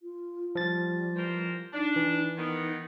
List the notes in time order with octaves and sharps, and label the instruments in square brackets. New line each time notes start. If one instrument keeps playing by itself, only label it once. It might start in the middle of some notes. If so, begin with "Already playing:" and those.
[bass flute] F4
[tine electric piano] F3 A6 [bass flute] G3
[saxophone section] E3 A#4 C5
[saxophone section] D4 [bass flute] D#4
[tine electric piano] E3
[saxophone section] D#3 B3 [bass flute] D#4